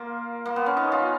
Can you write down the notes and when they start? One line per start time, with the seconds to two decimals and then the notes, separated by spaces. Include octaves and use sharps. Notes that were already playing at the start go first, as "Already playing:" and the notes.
Already playing: A#3 F4
0.45 A#3
0.56 B3
0.66 C#4
0.77 D#4
0.92 F4